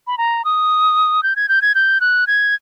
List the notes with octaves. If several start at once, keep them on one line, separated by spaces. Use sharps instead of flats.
B5
A#5
D#6
G6
G#6
G6
G#6
G6
F#6
G#6